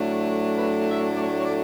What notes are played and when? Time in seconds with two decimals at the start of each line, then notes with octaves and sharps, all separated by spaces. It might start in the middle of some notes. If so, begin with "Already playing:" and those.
Already playing: A2 F#3 A3 D4
0.58 B4
0.89 E5
1.16 D5
1.21 C#5
1.37 C#5
1.45 D5